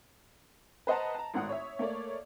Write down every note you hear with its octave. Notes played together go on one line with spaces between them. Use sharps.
B4 C5 D#5 F#5 A5 A#5
A5 A#5
G#1 A2 F#5 D#6
C#5 E5
A3 A#3 C#5 D5